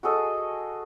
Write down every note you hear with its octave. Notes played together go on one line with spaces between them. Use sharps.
F#4 G#4 A4 D#5